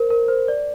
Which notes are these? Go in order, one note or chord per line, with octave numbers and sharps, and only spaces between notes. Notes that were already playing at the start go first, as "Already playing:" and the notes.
Already playing: A#4 C5
A#4
C5
D5